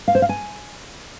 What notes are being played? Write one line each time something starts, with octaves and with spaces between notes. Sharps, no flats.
F5
C5
F5
G#5